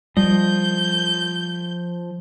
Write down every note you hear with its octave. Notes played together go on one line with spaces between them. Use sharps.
F3 G3 D#5 G6